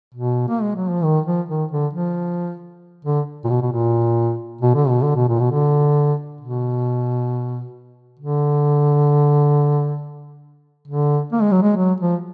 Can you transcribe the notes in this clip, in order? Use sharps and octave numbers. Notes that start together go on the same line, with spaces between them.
B2
A#3
G#3
F#3
F3
D#3
F3
D#3
D3
F3
D3
A#2
B2
B2
A#2
B2
D3
B2
D3
B2
A#2
B2
D3
B2
D3
D3
A#3
G#3
F#3
G#3
F#3
F3